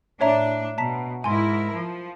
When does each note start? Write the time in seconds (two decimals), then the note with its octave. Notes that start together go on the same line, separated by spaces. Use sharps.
0.21 A2 D4 C#5 E5 A#5
0.78 B2 A5 A#5 B6
1.24 G#2 E4 A#4 G#5 C6
1.72 F3